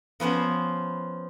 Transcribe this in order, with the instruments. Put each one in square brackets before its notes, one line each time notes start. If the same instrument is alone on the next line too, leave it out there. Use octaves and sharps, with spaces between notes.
[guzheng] F3 B3 C#4 C5